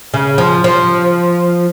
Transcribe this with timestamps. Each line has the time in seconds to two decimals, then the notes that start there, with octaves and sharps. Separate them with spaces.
0.14 C#3
0.38 F3
0.64 F3